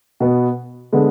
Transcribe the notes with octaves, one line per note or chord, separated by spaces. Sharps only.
B2 B3
D3 G#3 B3